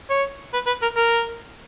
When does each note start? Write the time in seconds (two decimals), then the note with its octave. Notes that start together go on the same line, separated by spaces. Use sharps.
0.10 C#5
0.53 B4
0.67 B4
0.82 A#4
0.96 A#4